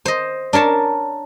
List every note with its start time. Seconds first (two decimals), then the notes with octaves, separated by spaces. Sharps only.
0.05 C5 D#5
0.53 D4 A#4 C#5 A5